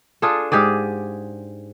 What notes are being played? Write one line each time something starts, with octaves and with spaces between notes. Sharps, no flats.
D4 F4 G#4 A4
G#2 G4 G#4 D5